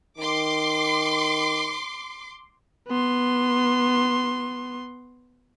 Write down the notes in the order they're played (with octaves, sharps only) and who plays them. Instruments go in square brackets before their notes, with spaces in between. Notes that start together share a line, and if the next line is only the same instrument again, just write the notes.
[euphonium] D#3 [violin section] C6 D6
[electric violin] B3 C6